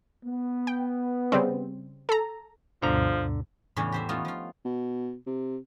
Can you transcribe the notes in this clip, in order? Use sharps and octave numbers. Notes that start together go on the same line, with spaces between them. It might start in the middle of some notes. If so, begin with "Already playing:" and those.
B3
G5
C#3 G3 C4
A4 A#5
D2 G2 B2 D3 F3 A#5
E2 A2 C#3 E3 C#4 D4
G4 C5 E5
A3 B3 C#4 D#4 F4
F3 F4
B2
C3